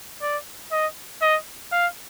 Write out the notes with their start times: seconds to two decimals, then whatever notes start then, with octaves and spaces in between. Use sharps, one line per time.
0.22 D5
0.72 D#5
1.22 D#5
1.72 F5